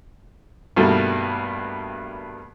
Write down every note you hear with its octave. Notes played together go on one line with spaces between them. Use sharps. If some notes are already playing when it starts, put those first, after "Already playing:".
G2 B2 D#3 G3 A3 A#3